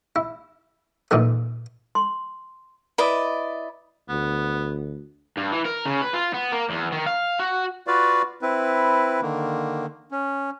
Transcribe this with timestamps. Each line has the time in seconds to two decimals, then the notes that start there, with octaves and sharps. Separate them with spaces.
0.16 E4
1.11 A#2 D#3 E3 A3
1.95 C6
2.98 E4 B4 D5 D#5
4.09 D2 B3
5.37 G2
5.52 E3
5.65 A#4
5.85 C#3
6.02 B4
6.14 F4
6.34 B3
6.52 A#3
6.70 E2
6.92 D#3
7.06 F5
7.40 F#4
7.87 F4 F#4 B4 D5 F5
8.42 C4 E4 B4
9.22 D3 D#3 A#3
10.11 C#4